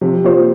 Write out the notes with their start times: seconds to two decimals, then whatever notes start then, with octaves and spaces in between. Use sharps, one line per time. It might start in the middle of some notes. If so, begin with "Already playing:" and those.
0.01 C3 F3
0.24 A#3 F4 C5